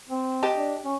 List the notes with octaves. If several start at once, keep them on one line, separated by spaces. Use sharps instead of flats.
C4
G4 D#5 A5
D4
C#4